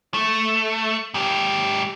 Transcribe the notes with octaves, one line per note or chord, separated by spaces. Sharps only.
A3
G#2 G4